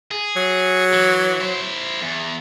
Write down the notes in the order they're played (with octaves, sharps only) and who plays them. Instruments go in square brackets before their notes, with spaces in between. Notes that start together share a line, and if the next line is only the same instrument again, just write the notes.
[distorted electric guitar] G#4
[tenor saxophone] F#3
[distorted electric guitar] E3
E4 C5
E2